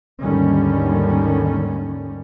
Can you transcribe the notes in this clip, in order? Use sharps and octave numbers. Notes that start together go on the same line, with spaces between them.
D#2 G#2 D3 D#3 G3 C#4